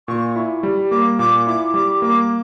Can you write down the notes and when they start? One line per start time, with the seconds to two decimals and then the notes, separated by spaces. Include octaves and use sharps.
0.08 A#2 C#6
0.36 E4
0.63 G3
0.91 A#3 D6
1.19 A#2 D6
1.47 E4 D6
1.74 G3 D6
2.02 A#3 D6